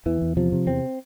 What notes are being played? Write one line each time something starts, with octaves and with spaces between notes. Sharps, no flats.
E2 E3
E2
C3 F3
C3
E2 C4